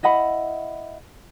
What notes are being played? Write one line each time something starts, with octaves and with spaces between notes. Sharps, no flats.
E4 D#5 F#5 B5